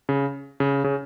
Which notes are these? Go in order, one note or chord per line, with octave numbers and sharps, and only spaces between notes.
C#3
C#3
C#3